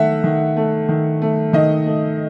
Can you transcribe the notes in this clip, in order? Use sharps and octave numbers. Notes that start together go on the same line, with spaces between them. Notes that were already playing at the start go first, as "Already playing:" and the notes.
Already playing: D#3 A3 E5 F#5
D#3
A3
D#3
A3
D#3 D#5
A3